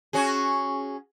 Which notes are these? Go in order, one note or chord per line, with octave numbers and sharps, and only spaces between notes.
C#4 F#4 G#4